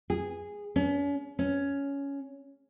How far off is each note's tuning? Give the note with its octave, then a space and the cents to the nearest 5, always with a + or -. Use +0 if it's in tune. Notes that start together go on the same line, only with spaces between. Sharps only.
G#4 -10
C#4 +40
C#4 +10